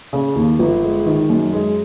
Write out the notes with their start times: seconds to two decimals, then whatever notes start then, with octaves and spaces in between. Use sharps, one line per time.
0.13 C#3
0.35 D#2
0.59 G1
0.83 G#3
1.06 D#3
1.29 F#2
1.53 G#3